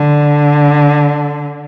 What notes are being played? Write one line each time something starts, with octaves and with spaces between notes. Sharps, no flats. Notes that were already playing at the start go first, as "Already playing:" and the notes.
Already playing: D3